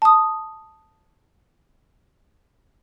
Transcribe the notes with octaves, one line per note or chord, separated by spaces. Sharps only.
A5 D#6